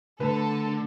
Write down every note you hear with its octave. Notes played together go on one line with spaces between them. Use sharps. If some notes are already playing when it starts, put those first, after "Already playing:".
D3 A3 A4 B4